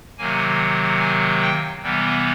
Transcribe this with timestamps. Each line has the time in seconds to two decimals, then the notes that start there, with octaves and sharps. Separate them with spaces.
0.18 C3 D#3 F#3 A#3 G#5
0.99 G#5
1.41 G5
1.82 C3 E3 G3 B3